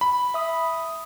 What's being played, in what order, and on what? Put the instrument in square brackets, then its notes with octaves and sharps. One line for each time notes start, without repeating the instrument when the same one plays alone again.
[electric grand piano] B5
[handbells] E5 D#6